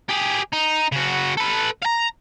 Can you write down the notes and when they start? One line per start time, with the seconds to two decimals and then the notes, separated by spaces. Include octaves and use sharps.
0.09 G4 G#4
0.53 D#4
0.92 C#3 F#4
1.37 A4 B4
1.82 F5 A#5